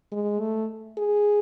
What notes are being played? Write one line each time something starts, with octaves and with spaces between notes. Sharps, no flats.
G#3
A3
G#4